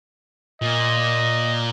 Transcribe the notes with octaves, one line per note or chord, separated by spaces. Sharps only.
A#2 D#5